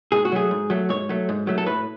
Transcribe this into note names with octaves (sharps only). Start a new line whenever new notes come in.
G#2 G#4
F#4
F#3 A3 G#4
G#2
F#3 A3
G#2 C#5
F#3 A3
G#2
F#3 A3
A4
A2 B4